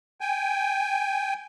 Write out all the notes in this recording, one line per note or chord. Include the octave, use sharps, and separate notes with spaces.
G5 G#5